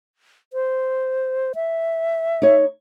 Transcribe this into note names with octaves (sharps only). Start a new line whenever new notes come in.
C5
E5
D#4 C#5